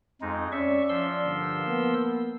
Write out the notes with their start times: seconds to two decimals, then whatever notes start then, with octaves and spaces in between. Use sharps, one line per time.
0.22 F2 G#3 D#4
0.52 C#4 D5 E5 C#6
0.89 F3 C6 E6
1.24 G2 D3 A#3
1.66 A#3 B3